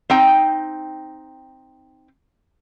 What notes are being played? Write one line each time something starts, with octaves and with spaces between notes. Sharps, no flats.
C4 D#4 G5